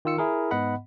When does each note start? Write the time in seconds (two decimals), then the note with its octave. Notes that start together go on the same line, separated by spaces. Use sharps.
0.05 D#3 F4 E6 C#7
0.18 E4 G#4 A#4
0.51 G#2 B3 D#5 F#5 B5